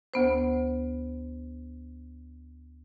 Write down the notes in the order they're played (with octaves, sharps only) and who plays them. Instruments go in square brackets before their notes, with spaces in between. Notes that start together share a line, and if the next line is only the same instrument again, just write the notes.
[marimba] D2 B3 C5